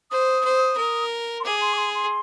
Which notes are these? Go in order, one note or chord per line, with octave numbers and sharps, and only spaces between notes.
C5 D#6
C5
A#4
C6
G#4 D6
C6
D6
C6
C6